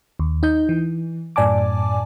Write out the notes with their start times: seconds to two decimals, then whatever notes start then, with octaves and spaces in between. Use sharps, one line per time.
0.19 D#2
0.43 D#4 D#5 G6
0.69 E3
1.36 F#2 A2 D5 G#5 A5 D6